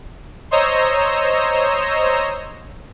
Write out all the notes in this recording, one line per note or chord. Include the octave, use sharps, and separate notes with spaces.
C5 C#5 D#5 A#5 E6